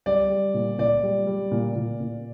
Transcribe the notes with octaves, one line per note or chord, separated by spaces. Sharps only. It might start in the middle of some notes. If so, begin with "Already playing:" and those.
G3 D5
G3
A#2
A#2 D5
G3
G3
A#2
A#2
A#2